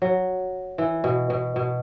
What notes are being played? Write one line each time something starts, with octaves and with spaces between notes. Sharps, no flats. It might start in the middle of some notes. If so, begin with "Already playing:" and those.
F#3
E3
B2
B2
B2